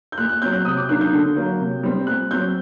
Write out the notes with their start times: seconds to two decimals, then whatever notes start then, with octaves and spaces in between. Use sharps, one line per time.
0.12 G6
0.18 A#2 F#6
0.29 F#6
0.42 F#3 C4 G6
0.53 F#6
0.65 C3 D#6
0.77 D6
0.89 D#3 F#3 A#3 D4 F#6
1.01 G6
1.13 D3
1.36 F#3 A#3
1.60 C3
1.83 G3 C4
2.07 A#2 F#6
2.31 F#3 C4 G6